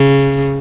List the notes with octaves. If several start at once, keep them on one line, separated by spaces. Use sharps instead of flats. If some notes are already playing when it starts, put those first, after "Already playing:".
Already playing: C#3